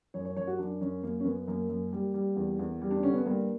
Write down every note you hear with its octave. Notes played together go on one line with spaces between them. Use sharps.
F#2 C#5
C#5
F#2 C#5
F#4
F#2 D4
F#2 C#4
F#2 A#3
C#4
F#2 B3
F#2 A#3
F#2
G3
G3
E2
E2
G3
D4
D3 C#4
B3
G2 A#3